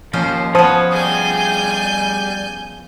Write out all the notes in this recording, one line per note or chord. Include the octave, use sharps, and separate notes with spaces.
D#2 F3 C#4 C5
F3 B3 C5 C#5 A5 D#6
G3 G#4 G#5 G6